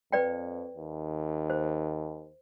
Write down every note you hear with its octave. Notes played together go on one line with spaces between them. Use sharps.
F2 B4 D5 G5
D#2
C5